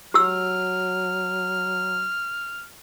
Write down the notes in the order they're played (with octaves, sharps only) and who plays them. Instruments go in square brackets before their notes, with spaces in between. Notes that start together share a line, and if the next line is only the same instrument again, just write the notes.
[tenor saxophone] F#3 [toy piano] G4 E6 [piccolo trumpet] F6